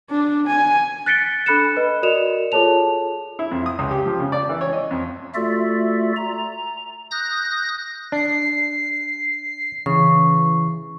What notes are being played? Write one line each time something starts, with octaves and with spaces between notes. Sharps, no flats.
D4
G#5
F#6 A6 B6 C#7 D7 G7
D4 A4 B5 F#6 C#7 E7
B4 D#5
F#4 A#4 D5 D#5 E7 F7
F4 G#4 A4 C#5 A5 F7
E4
F2
D#6
C#2
G4
F3
C#3
D5
E3
C#5
D#5
F2
A3 F4 F#4 A4 D5 E5
A#5
D#6 F#6 G6 A#6
D4 C7
C#3 E3 C#6